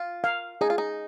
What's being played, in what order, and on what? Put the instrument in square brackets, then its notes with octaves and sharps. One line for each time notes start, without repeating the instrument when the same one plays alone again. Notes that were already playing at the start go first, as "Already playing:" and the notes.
Already playing: [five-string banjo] F4
[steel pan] F5
[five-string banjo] D#4 [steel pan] G#4
[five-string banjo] F4
D#4